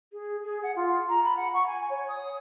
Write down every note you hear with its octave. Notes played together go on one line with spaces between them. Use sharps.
G#4
G#4
F#5
F4
A#5
B5
F#5
C#6
G#5
C#5
D#6